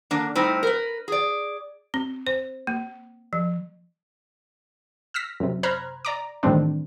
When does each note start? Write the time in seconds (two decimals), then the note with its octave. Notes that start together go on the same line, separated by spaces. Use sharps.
0.11 D3 A#3 D4
0.35 A2 G3 C4 D#4 E4
0.63 A#4 B4
1.08 G#4 D5
1.94 C4
2.27 C5
2.67 A#3
3.33 F3
5.14 E6 F6 A#6 B6
5.40 F#2 C3
5.63 C5 A#5 B5 F6 F#6 G#6
6.05 D5 A#5 D6
6.43 A2 D#3 E3 G3 C4 D4